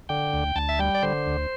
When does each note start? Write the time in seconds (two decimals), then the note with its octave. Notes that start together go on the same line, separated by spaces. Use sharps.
0.09 D3 G5
0.33 D2
0.56 D2 A5
0.69 E5
0.79 G3 G5
0.95 D5
1.03 D3 C5
1.27 D2